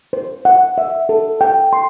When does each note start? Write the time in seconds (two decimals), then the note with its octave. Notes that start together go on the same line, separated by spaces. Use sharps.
0.13 C5
0.45 F#5
0.78 E5
1.09 A4
1.41 G5
1.73 C6